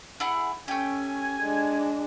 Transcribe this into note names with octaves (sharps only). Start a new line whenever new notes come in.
E4 G#4 F#5
A3 C#4 G4 G#5
G#3 D4